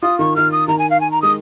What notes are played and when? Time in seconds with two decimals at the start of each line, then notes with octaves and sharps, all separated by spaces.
0.03 F4 D#6
0.19 D#3 C#6
0.36 D#3 F6
0.52 D#6
0.68 D#3 A#5
0.79 G#5
0.90 F5
1.01 G#5
1.12 A#5
1.22 G#3 D#6